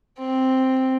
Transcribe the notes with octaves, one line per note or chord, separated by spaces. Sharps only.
C4